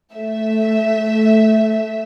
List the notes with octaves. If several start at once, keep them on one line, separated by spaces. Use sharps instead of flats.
A3 E5